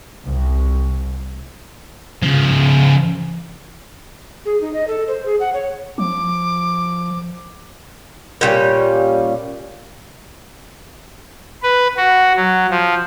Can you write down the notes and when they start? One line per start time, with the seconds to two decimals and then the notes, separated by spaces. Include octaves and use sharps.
0.24 C2
2.23 C#3 F3
4.45 G#4
4.61 D#4
4.74 D#5
4.88 A4
5.08 C5
5.26 G#4
5.40 F#5
5.54 C#5
5.98 F3 D6
8.41 A#2 G3 C#4
11.63 B4
11.97 F#4
12.36 F#3
12.70 F3